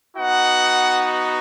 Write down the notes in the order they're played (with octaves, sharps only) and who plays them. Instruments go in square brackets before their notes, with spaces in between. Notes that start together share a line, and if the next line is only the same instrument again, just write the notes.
[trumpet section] B3 D#4 F#4 F#5